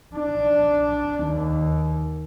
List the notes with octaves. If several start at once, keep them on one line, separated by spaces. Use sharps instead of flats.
D4
D#2